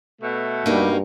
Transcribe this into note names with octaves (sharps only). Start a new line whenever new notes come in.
B2 A3
G2 G3 A#3 D#4 F#4